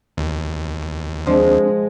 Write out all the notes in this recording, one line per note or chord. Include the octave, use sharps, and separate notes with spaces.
D#2
F3 G#3 C4 D4 C5